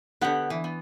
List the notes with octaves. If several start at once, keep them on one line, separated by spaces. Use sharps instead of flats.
D3 B3 G4 B4 F#5
E3
B3